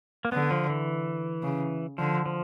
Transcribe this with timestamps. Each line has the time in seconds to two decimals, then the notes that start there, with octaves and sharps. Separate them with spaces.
0.25 A#3
0.32 D3 B3
0.51 F3
0.70 E3
1.43 C#3
1.98 D3 F3
2.26 F3